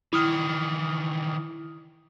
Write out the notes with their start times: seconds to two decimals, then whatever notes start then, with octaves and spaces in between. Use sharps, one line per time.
0.13 D#3 E3 E4 D#6 F6